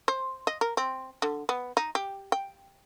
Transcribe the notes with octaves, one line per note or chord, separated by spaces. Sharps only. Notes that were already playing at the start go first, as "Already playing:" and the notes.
C5
D#5
A#4
C4
D3
B3
D#4
G4
G5